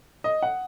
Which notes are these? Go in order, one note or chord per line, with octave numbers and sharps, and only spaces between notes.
D#5
F#5